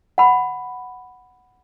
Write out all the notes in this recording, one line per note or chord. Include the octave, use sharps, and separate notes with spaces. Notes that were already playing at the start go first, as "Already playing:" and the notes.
F#5 B5